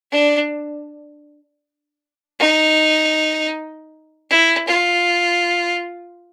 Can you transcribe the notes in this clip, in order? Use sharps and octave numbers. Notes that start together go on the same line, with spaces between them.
D4
D#4
E4
F4